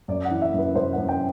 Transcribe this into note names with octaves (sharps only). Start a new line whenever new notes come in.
F#2 D5
F#5
E3
E5
F#2 B4
F#2 C5
F#5
F#2
G5